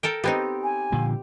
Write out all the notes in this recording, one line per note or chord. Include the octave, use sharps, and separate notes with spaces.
A4 A#4 G5
B3 C4 D#4 G4
G#5
A#2 D3 F3